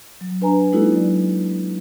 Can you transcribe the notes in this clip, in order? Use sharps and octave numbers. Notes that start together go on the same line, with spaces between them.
F#3
D4 B4 G#5 A#5
G#3 A#3 D#4 E4 F#4 A4
F#3 D5